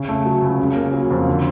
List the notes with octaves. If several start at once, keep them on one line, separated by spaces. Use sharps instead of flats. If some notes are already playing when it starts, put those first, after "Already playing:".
Already playing: C#3
A3
F#3
C#2
C#3
A#3
F#3
F2
D3